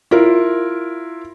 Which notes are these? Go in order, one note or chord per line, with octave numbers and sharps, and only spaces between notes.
E4 F4 A#4